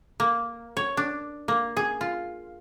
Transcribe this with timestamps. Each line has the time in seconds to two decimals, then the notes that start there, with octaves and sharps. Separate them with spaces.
0.20 A#3
0.77 C#5
0.97 D4
1.48 A#3
1.77 G#4
2.01 F4